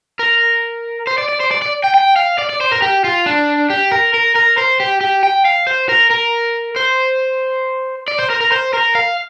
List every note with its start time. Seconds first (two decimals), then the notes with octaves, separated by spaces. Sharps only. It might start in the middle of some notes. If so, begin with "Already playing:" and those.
0.19 A#4
1.07 C5
1.18 D5
1.29 D5
1.40 C5
1.51 D5
1.62 D5
1.84 G5
1.94 G5
2.16 F5
2.38 D5
2.49 D5
2.61 C5
2.72 A#4
2.82 G4
3.04 F4
3.26 D4
3.70 G4
3.92 A#4
4.14 A#4
4.35 A#4
4.58 C5
4.80 G4
5.01 G4
5.23 G5
5.45 F5
5.67 C5
5.89 A#4
6.11 A#4
6.76 C5
8.08 D5
8.19 C5
8.30 A#4
8.41 A#4
8.52 C5
8.73 A#4
8.95 F5